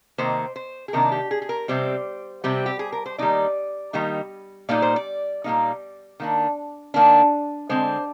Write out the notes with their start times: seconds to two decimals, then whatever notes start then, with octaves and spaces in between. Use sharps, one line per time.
0.18 C3 D#3 A#3 C5
0.56 C5
0.88 G#4
0.93 C3 D#3 A#3 D4 A#4
1.12 G4
1.31 G#4
1.42 G#4
1.49 A#4
1.68 C3 G3 C4 C5
2.44 C3 G3 C4
2.66 G4
2.79 G#4
2.92 A#4
3.06 C5
3.18 D#3 G3 A#3 D#4 D5
3.93 D#3 G3 A#3 D#4
4.69 A#2 G3 A#3 D#4 D5
4.82 C5
4.96 D5
5.44 A#2 G3 A#3 D#4
6.20 D#3 A#3 D4
6.94 D#3 A#3 D4
7.69 D3 G#3 C4 C5